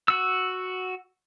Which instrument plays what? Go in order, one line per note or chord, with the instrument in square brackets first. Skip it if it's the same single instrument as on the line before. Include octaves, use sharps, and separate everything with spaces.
[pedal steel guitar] F#4 E6